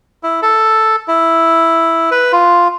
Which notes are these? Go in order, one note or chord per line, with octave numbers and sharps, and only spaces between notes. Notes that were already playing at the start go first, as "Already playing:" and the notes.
E4
A4
E4
B4
F4